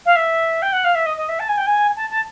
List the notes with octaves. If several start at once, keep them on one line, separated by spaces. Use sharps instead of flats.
F5
E5
G5
F#5
F5
E5
D#5
D#5
E5
A5
G#5
G5
G#5
A5
A5